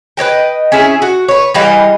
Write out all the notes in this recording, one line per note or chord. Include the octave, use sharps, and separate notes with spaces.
B4 C#5 D#5 G5
C#4 E4 G#4 E5
F#4
B4 C#5
E3 G3 D#5 F5